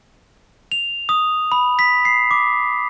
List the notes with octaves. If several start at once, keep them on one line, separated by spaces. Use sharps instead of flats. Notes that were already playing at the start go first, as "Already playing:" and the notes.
F7
D#6
B5
B6
C7
D6